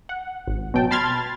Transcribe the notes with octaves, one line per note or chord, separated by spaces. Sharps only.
F#5
G#1
B2 F#3 G5 A5
A5 B5 C6 F6 G#6 A6